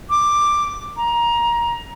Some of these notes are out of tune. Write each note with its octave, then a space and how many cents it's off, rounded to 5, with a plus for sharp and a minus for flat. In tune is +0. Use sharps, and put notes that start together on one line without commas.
D6 +5
A#5 +20